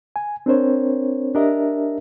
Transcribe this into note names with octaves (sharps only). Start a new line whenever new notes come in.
G#5
C4 D4 A#4 C5 C#5
D4 G4 A#4 D#5 E5